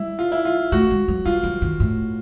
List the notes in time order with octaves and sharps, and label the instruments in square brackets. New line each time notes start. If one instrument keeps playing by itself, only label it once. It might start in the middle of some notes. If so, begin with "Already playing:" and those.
Already playing: [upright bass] G3 [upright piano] E4
[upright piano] F4
E4
F4
[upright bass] A3 [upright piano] F#4
[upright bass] G#3
F#3
[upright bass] G3 [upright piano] F4
[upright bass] F#3
D#3
A2